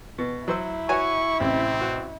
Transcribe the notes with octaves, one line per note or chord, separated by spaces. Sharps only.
B2
F#3 E4 C5 E6
F#4 C#5 G#5 C#6
A1 C3 C4
F#4